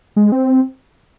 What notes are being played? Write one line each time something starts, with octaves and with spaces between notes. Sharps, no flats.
G#3
C4